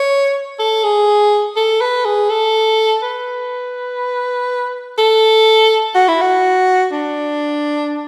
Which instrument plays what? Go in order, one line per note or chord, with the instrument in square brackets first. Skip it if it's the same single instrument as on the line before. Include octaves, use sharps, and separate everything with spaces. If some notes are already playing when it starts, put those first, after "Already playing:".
Already playing: [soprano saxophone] C#5
A4
G#4
A4
B4
G#4
A4
B4
A4
F#4
E4
F#4
D4